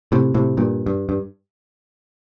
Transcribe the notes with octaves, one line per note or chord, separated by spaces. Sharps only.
A2 C3
A2 C3
G2 A#2
G2
G2